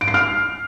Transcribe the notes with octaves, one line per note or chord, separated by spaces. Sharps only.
D7
C7
F6